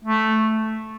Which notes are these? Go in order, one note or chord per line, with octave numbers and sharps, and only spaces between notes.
A3